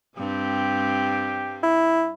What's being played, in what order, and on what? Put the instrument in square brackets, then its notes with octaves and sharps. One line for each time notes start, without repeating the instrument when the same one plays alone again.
[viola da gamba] G2 G3 C4 [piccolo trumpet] G4
[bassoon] E4